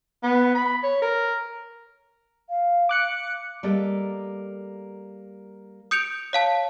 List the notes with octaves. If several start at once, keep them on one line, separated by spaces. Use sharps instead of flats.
B3
B5
C#5
A#4
F5
D6 F#6 C#7
G3 A#3 A4 D#5
D#6 G6 C#7 D7 F7
C#5 F5 A5